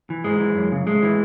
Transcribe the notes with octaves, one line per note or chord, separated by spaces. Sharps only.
E3
G#2 G#3
E3
F#2
C#3
A2 G#3
E3